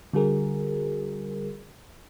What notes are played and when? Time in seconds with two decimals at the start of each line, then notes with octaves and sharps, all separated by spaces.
0.14 D3 G3 F#4 G#4 A#4